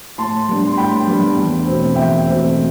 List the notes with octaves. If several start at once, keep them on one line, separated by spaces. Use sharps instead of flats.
A2 A5 C6
G3 B3 D4
C6
A2 G5 B5
G3 B3 D4
E2
B2 A3 C4
E2 E5 G5
B2 A3 C4